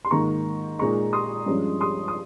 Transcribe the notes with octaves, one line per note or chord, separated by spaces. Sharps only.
C6
G#2 D#3 A#3 A#5 C#6
A#2 G#3 D#4 A#5 C#6
C6 D#6
G2 F3 G#3 C#4
C6 D#6
D#6